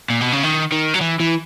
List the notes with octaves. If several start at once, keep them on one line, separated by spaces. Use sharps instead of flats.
A#2
B2
C#3
D#3
D#3
F#3
E3
E3